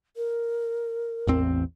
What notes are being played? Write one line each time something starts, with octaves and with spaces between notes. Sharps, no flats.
A#4
A1 E2 C4